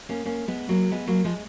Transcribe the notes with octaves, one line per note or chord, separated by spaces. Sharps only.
A#3 C#4
A#3 C#4
G#3 B3
F#3 A#3
G#3 B3
F#3 A#3
F3 G#3